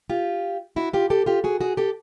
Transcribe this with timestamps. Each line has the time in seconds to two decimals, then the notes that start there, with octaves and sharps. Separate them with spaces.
0.10 F4 G4
0.76 E4 F#4
0.93 F4 G4
1.10 G4 A4
1.26 F4 G4
1.44 F#4 G#4
1.61 F#4 G#4
1.77 G4 A4